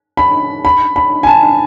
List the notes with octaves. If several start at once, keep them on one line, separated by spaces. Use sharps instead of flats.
B5
B5
B5
G#5
A5